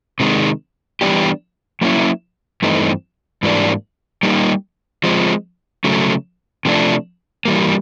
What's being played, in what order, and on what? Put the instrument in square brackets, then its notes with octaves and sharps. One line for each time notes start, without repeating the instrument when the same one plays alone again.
[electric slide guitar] C3 D#3 G#3
E3 G3 B3 D4 G4
F#3 A#3 C#4 E4
G2 E3 A3 C4 D#4
G#2 E3 G3 A#3 D4
G3 A#3 D#4 G4
F3 G#3 C4
C#3 F#3 A3
C3 F3 A3 D4
E3 G3 A#3